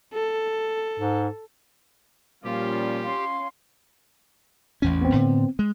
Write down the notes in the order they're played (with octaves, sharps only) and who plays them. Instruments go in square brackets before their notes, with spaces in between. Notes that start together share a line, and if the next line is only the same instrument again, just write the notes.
[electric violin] A4
[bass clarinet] G#2
[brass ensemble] A#2 F3 G3 [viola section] C#4 F4 [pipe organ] G4
[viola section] C#4 [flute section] F5 C6
[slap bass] A1 E2 C#4
[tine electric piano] B3 C4
[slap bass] A2 D3
G#3